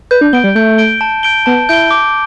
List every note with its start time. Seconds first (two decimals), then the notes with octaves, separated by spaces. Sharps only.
0.11 B4 G6
0.21 D4
0.33 B3 D7 G7
0.44 G3
0.55 A3 G6
0.78 D7 G7
1.01 A5
1.23 G6 D7 G7
1.46 B3 A5
1.69 E4 G6 D7 G7
1.91 D6